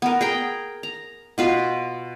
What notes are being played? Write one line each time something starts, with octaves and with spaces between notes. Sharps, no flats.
B3 A#4
G#4 G5 A#5
A#5
B2 F4 B4